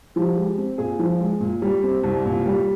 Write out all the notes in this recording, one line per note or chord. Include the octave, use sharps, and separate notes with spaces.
F3 G4
G#3
C4
A#2 G#4
F3
G#3
A#2
G3
C4
C2
A#2
G3